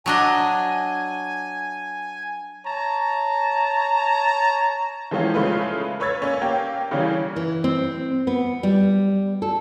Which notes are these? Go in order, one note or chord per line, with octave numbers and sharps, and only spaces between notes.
F#3 D4 D#5 G#5
C#5 A5 A#5
E3 F3 G#3 C4 C#4 F4
C#3 G#3 A3 F4 B4
B4 C#5 E6 G#6 A6
A#3 C#4
A#3 G4
C#3 E3 G3 A#3 C#4
E3
C4
B3
G3
A4